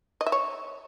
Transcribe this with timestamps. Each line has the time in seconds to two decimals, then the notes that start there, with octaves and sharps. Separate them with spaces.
0.21 D#5
0.26 E5
0.32 C#5